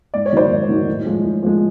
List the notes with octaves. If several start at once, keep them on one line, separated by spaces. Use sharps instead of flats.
G#2 D5
C#5
D#3 F#3 C5 D5
G#2
D#3 F#3
A2
F3 G#3
A2
F3 G#3